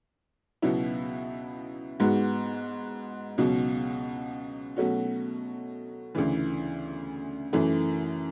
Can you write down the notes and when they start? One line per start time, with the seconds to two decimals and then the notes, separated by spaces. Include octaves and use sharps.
0.62 C#2 B2 F#3 B3 E4
2.00 G#2 G#3 B3 F#4
3.38 C#2 B2 F#3
4.76 B2 F#3 A3 C#4 F#4
6.15 D2 C#3 E3
7.53 F#2 E3 A3